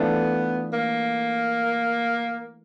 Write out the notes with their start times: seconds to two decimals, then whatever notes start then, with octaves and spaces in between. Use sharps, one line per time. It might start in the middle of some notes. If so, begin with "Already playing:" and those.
Already playing: E3 A3 B3 D4 F4 A4
0.73 A#3